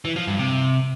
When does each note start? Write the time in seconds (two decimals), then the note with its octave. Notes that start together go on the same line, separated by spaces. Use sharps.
0.05 E3
0.16 F3
0.27 G2
0.39 C3